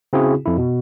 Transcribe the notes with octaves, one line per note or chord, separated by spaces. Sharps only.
C#3 C4 E4 F#4 G#4
F2 E4
B2